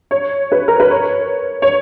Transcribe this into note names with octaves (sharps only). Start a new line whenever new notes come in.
C#5
B4
A#4
B4
C#5
C#5